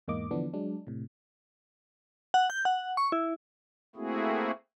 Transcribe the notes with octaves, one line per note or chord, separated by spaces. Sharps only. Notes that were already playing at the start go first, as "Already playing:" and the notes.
E2 G#2 A#3 D#5 D6
D3 E3 F3 B3 D4
F#3 G#3 D4
A2 C3
F#5
G6
F#5
C#6
E4
A3 A#3 C4 E4 F#4 G#4